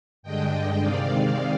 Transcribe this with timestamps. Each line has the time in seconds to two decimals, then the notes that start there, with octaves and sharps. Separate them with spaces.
0.23 G2 D3 G#3 D4 D#5 G5
0.80 C3 D#3 G#3 C4 D5 F5